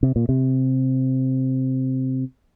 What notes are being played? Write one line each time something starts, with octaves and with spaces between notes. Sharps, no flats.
C3
A#2
C3